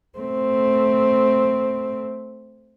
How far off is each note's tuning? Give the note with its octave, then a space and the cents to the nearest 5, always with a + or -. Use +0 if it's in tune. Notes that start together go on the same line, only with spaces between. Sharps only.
A3 +0 C4 +0